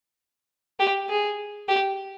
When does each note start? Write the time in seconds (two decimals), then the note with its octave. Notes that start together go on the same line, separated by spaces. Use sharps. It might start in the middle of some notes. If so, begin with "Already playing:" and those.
0.80 G4
1.09 G#4
1.68 G4